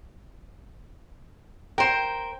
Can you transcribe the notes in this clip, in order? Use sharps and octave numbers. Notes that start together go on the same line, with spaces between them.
A#4 C5 G5